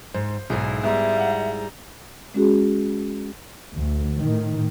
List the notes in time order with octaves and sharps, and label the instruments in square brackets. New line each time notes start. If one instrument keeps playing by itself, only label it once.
[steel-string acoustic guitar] G#2 [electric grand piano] C5
[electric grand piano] B1 [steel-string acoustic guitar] G#2 E4 G#4
[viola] G3 A#5 [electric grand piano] G#3 B3 [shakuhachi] E5
[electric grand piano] F5 F#5
[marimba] G#3 C#4 F#4 G#4
[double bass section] D2
A2 D#3